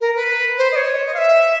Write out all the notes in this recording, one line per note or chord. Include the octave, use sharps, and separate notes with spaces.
A#4
B4
C5
D#5
C#5
D#5
F5
E5